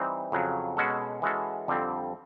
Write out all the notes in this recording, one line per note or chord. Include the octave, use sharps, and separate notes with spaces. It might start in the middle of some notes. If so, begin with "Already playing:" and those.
Already playing: E3 G3 C4 D#4
F2 C#3 F#3
B2 G#3 C#4 F#4 A4
E3 G#3 C#4 F#4 A4
F2 D3 G3 C4